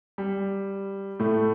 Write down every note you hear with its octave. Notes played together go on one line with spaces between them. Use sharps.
G3
A2 A3